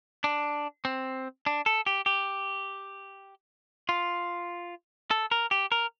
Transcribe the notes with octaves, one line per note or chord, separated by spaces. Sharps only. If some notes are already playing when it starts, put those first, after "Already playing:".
D4
C4
D4
A4
G4
G4
F4
A4
A#4
G4
A#4